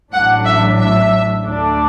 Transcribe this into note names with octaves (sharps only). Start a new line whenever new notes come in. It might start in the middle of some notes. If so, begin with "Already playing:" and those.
A1 A2 F#3 D4 F#5
E5
E5
D2 D3 A3 D4